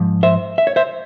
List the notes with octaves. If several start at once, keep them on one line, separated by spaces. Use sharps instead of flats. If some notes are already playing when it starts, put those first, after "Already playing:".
Already playing: G#2 F3
C5 E5
E5
C#5
C5 E5